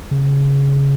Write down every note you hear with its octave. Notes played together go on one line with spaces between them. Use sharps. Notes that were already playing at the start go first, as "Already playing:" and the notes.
C#3